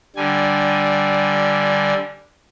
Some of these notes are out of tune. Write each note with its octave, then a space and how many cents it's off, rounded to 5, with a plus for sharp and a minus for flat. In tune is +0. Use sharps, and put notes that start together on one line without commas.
D3 +0 G3 -15 G#5 +0